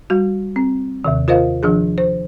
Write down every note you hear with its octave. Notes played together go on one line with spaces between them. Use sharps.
G3 F#4
C4
D#2 C3 D#3
F4 A#4 C5 D#5 F5
D#3 F3 D4 G#4
C5